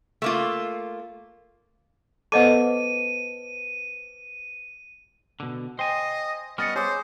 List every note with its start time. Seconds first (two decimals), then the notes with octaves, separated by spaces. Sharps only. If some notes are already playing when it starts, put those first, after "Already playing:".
0.22 A3 A#3 F4
2.32 B3 A4 B4 C5 D#5 A5 D6 D#7
5.40 B2 D3
5.79 C5 D#5 G5 G#5
6.58 G3 B3 C#4 D#5 F6 A6 C#7
6.76 G#4 C5 C#5 D6